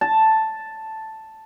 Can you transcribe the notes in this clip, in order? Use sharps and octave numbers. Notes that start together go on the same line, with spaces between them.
A5